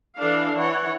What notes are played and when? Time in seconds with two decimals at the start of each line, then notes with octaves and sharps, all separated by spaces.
0.17 E3 D4 A4 F5
0.55 E3 C#5 F#5